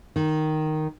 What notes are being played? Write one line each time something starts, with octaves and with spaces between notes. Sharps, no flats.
D#3